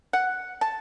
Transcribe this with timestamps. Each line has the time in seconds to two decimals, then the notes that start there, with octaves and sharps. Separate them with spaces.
0.13 F#5
0.61 A5